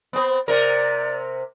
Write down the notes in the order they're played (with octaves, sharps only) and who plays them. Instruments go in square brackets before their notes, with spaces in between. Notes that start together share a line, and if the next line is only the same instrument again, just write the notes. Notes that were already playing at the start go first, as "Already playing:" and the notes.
[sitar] B3 C4
[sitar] C3 A#4 [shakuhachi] D5